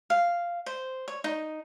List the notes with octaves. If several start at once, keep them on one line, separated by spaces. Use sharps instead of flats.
F5
C5
C#5
D#4